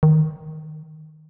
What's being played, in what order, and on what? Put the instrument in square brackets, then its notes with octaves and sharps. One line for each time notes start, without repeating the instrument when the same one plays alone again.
[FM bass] D#3